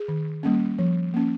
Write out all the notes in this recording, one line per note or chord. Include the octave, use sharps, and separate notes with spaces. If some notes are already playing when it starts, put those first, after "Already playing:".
Already playing: G#4
D#3
G3 A#3 C#4
F3
A#3 C#4